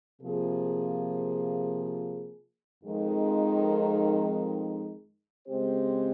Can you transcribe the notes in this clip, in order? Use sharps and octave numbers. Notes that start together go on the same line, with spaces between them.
C3 F3 A#3 F4 G#4
F2 D#3 G#3
C#3 G#3 C4 G4 C5